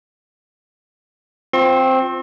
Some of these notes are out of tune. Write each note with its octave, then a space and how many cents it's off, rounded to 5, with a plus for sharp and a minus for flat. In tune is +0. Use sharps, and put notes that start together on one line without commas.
C4 +0 F4 +10 C6 +45